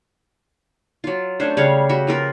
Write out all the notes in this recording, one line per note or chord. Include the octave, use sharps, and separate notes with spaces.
F#3 F4
A3 C#4 D4 C5
C#3 G3 C#5 F5
F#4 G4 E5
F3 F4 A#4 B4